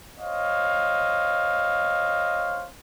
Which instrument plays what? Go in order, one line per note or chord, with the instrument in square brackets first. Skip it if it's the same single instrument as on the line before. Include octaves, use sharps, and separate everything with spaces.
[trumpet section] C5 C#5 D#5 F5